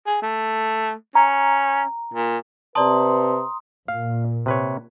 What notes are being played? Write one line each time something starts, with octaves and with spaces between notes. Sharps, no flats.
G#4
A3
C#4 A#5
A#2
C3 B4 D5 A5 A#5 C6 D#6
A#2 F5
C3 B4 C#5